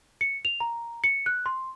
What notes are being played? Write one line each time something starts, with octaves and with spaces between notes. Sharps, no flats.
C#7
F7
A#5
C#7
F#6
C6